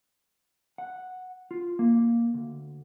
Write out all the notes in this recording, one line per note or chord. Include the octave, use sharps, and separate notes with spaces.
F#5
F4
A#3
D2